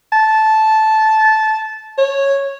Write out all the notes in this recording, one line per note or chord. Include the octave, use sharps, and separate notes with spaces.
A5
C#5